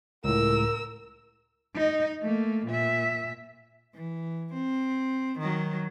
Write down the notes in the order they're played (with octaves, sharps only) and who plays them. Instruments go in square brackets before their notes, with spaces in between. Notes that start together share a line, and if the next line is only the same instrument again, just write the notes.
[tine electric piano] C#2 A2 [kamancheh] A#4 E6
[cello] D#4 D#5
A3 A#3
A#2 E5
E3
C4
D#3 F#3